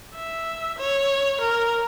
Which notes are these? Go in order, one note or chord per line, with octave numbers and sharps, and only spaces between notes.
E5
C#5
A#4